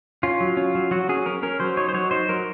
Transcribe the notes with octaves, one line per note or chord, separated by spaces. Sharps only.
C#4 F4
F#3
C#4
F#3
F#3 F#4
C#4 G#4
C#4 A#4
C#4 A#4
F#3 C5
D#4 C#5
C5
F#3 C#5
D#4 C5
F#3 A#4